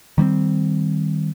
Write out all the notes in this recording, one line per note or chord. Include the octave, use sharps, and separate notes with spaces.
D#3 G3 B3 C4